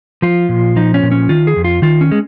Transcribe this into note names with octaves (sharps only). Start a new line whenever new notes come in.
F3 F4
A#2
F3 D#4
C#4
A#2
C#4
D#3 F4
G#4
F2
F4
D#3 F4
C#4
G#3